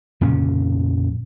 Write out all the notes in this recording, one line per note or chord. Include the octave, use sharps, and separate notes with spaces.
F2 A#2 C#3 C#4